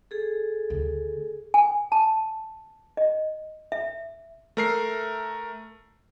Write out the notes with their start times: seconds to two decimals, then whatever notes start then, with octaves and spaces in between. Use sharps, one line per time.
0.11 G#4 A4
0.70 D2 D3
1.54 G#5
1.92 A5
2.97 D#5
3.72 E5
4.57 A3 A#4 C7